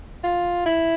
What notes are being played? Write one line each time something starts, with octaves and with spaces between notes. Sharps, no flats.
F4
E4